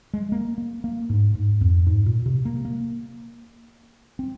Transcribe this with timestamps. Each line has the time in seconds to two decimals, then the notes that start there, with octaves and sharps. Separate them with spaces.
0.14 G#3
0.32 A#3
0.58 A#3
0.84 A#3
1.09 G#2
1.35 G#2
1.61 F2
1.87 G#2
2.06 A#2
2.26 C3
2.45 A#3
2.65 A#3
4.19 C4